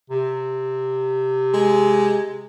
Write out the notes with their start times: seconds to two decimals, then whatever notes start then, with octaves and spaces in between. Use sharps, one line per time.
0.10 C3
1.54 G#3